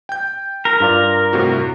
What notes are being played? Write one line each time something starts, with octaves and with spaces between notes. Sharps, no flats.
G5 G6
A#4
G2 F4 D5
A2 C3 F#4